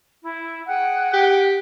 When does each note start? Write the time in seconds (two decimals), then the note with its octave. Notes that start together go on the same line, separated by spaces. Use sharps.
0.23 E4
0.67 G#4 F#5 G5
1.14 G4